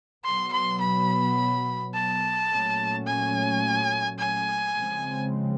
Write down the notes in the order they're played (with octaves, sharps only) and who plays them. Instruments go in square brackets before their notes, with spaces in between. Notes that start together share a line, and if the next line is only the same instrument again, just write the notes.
[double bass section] B2 F#3 B3 [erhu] C6
[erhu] C6
B5
A5
[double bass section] A#2 F#3 A3 C#4
[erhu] G#5
G#5
[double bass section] C#3 F3 G#3 C4